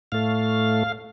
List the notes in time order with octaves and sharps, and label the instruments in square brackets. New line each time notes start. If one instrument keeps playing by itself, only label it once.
[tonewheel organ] A2 A3 F5